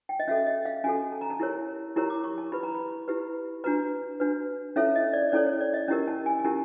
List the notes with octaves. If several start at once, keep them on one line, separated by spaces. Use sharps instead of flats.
G5
D#5
C#4 F#4 A4 E5
D#5
F5
C#4 F#4 A4 G#5
A5
A#5
A5
E4 G4 A#4 C#5
E4 G4 A#4 C#5 A#5
D6
C#6
A5
E4 G4 B4 B5
A#5
B5
E4 G4 B4
D4 F#4 B4 A#5
D4 F#4 B4
C#4 E4 A4 C#5 E5
D#5
D5
C#4 E4 A4 C#5 D5
C#5
D5
D#5
C#4 E4 G4 A#4
A5
G#5
G#5
C#4 E4 G4 A#4 A5